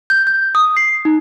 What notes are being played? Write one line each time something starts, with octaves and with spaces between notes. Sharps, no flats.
G6
G6
D#6
C7
D#4